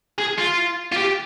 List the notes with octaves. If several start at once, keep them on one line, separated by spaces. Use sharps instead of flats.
G#4
F4
F4
G4